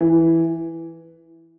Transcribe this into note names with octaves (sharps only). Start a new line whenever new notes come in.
E3